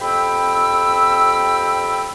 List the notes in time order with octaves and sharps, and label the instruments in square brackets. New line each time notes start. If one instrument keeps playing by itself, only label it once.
[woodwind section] F2 G4 G5 B5 E6